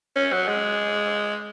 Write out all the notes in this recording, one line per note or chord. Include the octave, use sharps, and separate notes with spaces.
C#4
F#3
G#3